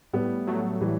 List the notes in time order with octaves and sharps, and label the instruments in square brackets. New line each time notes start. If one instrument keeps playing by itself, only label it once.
[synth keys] A2 [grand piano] G3 B3
[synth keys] F#3 A3
[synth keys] A2 [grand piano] E3 G3